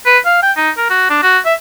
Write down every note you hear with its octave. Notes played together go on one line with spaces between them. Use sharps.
B4
F5
G5
D#4
A#4
F#4
D4
F#4
E5